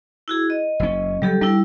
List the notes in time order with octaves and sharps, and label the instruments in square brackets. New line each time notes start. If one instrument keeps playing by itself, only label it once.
[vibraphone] E4 F#4 G#4
D#5
[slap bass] F#1 C#4
[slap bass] C#3 F#3 [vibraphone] G3 G4 A4
[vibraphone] G3 E4 [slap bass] D4